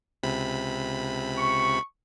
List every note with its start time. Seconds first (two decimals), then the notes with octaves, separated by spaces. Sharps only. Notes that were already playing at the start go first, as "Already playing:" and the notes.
0.23 C#2 C3 B5
1.37 C#6